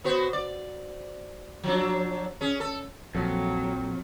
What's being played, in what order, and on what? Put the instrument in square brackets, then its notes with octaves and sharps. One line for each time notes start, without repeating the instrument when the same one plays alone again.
[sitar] B3 F#4 C5
D5
F3 F#3 D4
C#4 G#4
A4
[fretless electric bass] A#1 [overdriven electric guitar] F2 [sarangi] F#3 [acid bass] A4